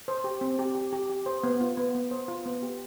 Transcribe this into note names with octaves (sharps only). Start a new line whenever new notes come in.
C5
G4
C4
G4
G4
G4
G4
C5
B3
F4
B3
B3
C5
F4
B3
G4